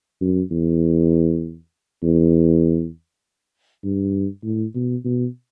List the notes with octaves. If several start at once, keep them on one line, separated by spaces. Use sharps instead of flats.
F#2
E2
E2
G2
A2
B2
B2